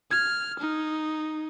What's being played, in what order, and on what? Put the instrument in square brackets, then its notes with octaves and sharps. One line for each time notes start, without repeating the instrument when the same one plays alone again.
[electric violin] F6 [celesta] G#6
[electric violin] D#4